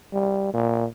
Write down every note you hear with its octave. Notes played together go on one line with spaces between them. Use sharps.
G3
A#2